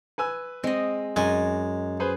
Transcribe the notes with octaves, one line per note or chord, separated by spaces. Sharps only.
B4 G#5 E6
G#3 C4 D#5
F#2 G#3 G#5
G#4 B4 C5